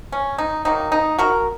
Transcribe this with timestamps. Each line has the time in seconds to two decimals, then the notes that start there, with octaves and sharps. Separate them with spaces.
0.12 C#4
0.38 D#4
0.65 D#3 F#3 A#3 D#4
0.92 D#4
1.18 F#4 A#4